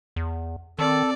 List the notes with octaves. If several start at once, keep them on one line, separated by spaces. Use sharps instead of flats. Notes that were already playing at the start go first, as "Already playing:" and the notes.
E2
D#3 C4 A4 D5